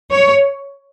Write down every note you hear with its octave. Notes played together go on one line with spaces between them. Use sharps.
C#5